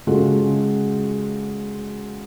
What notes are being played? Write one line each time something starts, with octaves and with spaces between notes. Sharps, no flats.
C#3 G#3 F4 F#4 A4